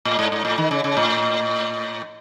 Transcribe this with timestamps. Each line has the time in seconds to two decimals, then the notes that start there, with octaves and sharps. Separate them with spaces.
0.05 A2
0.19 G#2
0.32 G#2
0.45 A2
0.58 D#3
0.71 C#3
0.84 C#3
0.97 A2